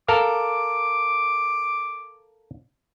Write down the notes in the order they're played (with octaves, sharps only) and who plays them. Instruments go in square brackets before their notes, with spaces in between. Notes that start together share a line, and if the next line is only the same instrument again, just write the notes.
[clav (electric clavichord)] A4 A#4 F5 [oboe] D6